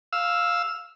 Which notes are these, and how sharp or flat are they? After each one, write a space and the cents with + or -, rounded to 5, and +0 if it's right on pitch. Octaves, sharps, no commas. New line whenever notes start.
F5 +0 E6 +0